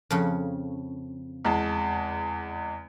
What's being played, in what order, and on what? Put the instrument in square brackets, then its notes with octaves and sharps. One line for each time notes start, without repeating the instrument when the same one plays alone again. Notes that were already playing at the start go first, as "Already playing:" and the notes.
[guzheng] F2 C#3
[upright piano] E2 G#3 A5